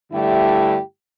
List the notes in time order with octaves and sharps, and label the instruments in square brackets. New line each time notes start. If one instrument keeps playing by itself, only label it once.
[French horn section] G2 D3 A3 E4 G4